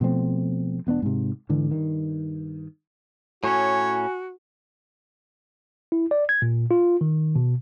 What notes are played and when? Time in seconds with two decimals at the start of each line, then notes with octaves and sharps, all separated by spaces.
0.01 B2 F3 A3 C4
0.87 E1 B3 C4 D4
1.02 G#2 C3
1.49 G#2 D3 E3
1.71 G2 D#3
3.44 A2 C#4 F#4 C#5 G#5
5.92 E4
6.11 D5
6.29 G#6
6.42 A#2
6.71 F4
7.01 D#3
7.36 B2